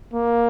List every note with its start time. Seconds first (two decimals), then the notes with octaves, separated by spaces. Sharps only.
0.14 A#3